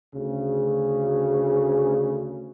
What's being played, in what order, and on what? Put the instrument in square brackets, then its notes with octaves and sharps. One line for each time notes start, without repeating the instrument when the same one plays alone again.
[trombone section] D2 C#3